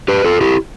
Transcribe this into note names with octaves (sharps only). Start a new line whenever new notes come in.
G4 B4
F4 A4
E4 G4